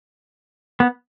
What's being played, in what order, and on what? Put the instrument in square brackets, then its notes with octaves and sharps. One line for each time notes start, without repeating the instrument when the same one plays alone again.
[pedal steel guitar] B3